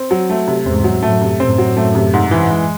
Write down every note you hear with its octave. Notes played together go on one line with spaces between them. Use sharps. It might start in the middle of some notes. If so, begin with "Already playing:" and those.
Already playing: C4
F#3
A3
C3
E2 G#2 C4
F#3
F#2 A2 A3
C3
F#2 A2 C4
F#3
A3
C3
G#2
E3
G#3